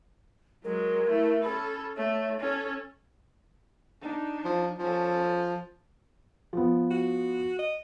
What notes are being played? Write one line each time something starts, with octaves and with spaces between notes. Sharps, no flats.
F#3 G#3 A#4
A3 E4
C#4 A4 B5
A3 C#5
C#4 A4
D4 D#4
F3
F3 C#4 A4
F3 B3
F#4
D#5